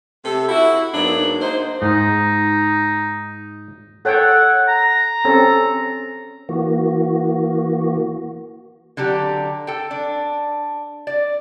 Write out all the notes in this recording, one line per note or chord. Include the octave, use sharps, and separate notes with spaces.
C3 A4
E4 F#4
G#2 F#3 A#3 B3 D4
A#3 D#4 C5
G#2 D#4
A4 C#5 F#5 G5
A#5
C4 C#4 A4
E3 A#3 F#4
D3 F#3 D4 G4
A4 G5
D4
D5